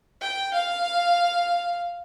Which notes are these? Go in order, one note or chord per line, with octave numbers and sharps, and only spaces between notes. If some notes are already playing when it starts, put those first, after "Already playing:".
G5
F5